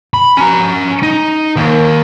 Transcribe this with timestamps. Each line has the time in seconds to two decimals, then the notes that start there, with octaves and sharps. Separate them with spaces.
0.14 B5
0.37 C#4 A#5
1.03 D#4
1.56 D#2